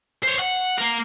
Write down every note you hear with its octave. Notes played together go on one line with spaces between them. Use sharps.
C5 C#5
F#5
A#3 A#4